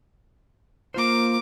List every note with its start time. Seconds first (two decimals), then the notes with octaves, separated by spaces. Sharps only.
0.94 A#3 F4 A#4 C5 D6